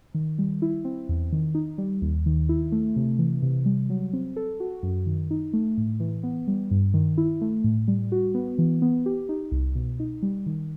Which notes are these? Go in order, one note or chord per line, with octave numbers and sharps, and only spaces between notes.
D#3
G3
E4
C4
E2
D#3
D#4
G3
D#2
D#3
E4
A3
C3
E3
C3
G3
F#3
C4
A4
F#4
F#2
D#3
D#4
A3
A2
E3
B3
G3
G2
D#3
E4
A3
A2
G3
F#4
B3
E3
B3
G4
D#4
C2
B2
D#4
G3
D#3